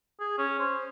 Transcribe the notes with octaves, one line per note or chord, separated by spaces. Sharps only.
G#4
C#4
C5